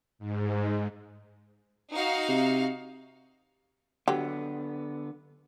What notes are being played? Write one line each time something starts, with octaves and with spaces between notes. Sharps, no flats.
G#2
D#4 F#4 F5
C3
D3 F#3 B3 G4